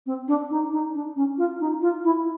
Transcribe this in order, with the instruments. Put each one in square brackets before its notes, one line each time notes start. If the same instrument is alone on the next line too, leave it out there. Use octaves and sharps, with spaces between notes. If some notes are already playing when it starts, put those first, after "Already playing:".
[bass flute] C4
D4
D#4
D#4
D4
C#4
F4
D#4
F4
E4